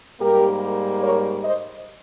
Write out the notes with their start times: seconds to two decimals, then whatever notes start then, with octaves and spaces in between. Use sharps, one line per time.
0.19 G#2 G3 A#3 G4 A#4
1.02 A#4 C#5
1.43 C5 D#5